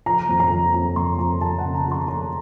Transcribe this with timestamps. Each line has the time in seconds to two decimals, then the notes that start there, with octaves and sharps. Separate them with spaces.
0.06 F3 A#5
0.29 F2
0.40 A#5
0.52 F2
0.73 F2 A#5
0.96 F2 C6
1.18 F2 A#5
1.41 F2 A5
1.58 F#5
1.64 C#3
1.74 A#5
1.86 F3
1.91 C6
2.08 F3 A#5